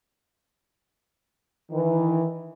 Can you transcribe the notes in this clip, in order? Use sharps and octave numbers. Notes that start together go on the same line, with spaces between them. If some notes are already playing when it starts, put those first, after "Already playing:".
D#3 E3